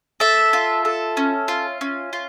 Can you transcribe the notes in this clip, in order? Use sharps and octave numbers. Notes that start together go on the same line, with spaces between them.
A4 E5
F4
A4
C#4
F4
C#4
F4